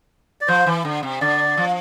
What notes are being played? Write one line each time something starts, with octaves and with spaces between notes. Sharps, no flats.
D5
F3 C5
E3
D3
C3
D3 D5
F3